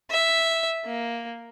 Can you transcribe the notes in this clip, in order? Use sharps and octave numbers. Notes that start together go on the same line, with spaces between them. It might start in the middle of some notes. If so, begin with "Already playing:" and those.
E5
A#3